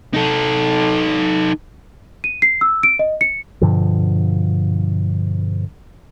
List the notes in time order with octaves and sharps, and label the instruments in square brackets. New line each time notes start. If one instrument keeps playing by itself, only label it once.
[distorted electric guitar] D#4 A4
[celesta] D#7
C7
E6
D7
D#5
C#7
[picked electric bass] G2 B2 D3 F3